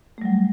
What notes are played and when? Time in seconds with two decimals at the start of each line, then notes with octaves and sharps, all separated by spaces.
0.18 A3
0.22 G3
0.25 F#3